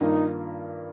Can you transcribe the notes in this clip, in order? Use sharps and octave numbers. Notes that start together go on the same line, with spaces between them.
G2 D#3 A#3 D#4 F4